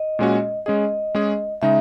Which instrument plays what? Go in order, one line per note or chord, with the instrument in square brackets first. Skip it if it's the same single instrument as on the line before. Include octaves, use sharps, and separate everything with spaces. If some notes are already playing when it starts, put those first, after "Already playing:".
Already playing: [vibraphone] D#5
[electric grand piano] A#2 G#3 C#4 F#4
[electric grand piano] G#3 C#4 G#4 [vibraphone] D#5
[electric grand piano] G#3 C#4 G#4
[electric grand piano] C#3 G#3 D#4 [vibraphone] E5